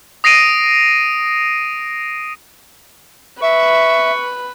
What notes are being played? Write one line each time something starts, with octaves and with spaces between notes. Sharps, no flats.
D#6 A#6 C7 D7 D#7
B4 E5 C#6